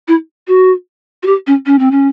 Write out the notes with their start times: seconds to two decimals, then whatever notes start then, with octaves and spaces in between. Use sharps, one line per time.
0.08 E4
0.48 F#4
1.23 F#4
1.26 G4
1.47 C#4
1.66 C#4
1.79 C4
1.91 C#4